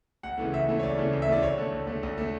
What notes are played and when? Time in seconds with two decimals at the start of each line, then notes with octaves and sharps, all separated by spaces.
0.23 D2 F#5
0.38 C#3 E3 A3
0.53 D2 E5
0.68 C#3 E3 A3
0.79 C#5
0.83 D2 D5
0.98 C#3 E3 A3
1.13 D2
1.22 E5
1.28 C#3 E3 A3 D5
1.42 D2 C#5
1.58 D3 A3
1.72 D2
1.87 D3 A3
2.03 D2
2.18 D3 A3